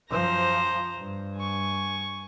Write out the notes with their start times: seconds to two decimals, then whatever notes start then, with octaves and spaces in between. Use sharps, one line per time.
0.11 F#2 F3 C5 A#5
0.96 G2
1.36 G#5 C#6